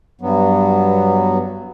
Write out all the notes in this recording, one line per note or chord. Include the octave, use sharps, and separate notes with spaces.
G2 F#3 B3